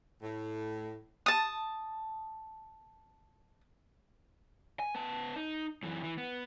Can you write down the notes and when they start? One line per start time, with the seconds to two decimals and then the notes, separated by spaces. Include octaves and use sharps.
0.22 A2
1.26 A5 D#6
4.80 G#5
4.95 B3 A5
5.36 D#4
5.83 F#2 E3
6.04 E3
6.18 B3